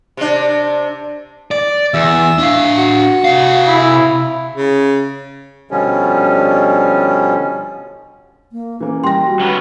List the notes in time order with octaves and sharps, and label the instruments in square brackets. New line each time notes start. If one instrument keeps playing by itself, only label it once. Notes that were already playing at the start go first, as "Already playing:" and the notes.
[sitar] C3 D4
[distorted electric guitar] D5
[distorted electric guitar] E2 [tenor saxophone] E5
[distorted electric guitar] D4 F5
[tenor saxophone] F#4
[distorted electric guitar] C3 F5
[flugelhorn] E4
[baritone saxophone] C#3
[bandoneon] B2 D3 F3 G3 C#4
[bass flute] A#3
[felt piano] E3 A#3 [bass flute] C#4
[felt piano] G3 A#6 [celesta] G5 C6
[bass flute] F#4
[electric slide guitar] F#3 C#4 B4